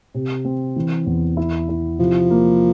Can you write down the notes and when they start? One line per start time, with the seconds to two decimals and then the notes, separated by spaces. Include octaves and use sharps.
0.14 C3
0.45 C4
0.76 E3
1.06 E2
1.37 E4
1.69 E4
1.99 C3 F3
2.30 A#3